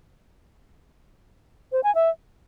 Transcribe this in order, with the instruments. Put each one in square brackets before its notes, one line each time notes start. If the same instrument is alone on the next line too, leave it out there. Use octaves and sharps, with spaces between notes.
[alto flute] C5
G#5
E5